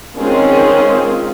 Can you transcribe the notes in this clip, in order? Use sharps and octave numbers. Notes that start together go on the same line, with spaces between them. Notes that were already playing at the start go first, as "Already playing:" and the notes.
D#3 G#3 C4 C#4 F4 G#4